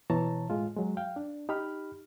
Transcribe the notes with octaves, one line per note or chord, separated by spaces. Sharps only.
B2 E3 C#5 A5 A#5
A2 G#3 F4
F#3 G#3
F5 G5
D4
D#4 G4 B5 F6